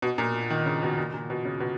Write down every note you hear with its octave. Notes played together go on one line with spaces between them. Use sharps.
B2
A#2
D#3
C#3
B2
A#2
A#2
B2
C#3
B2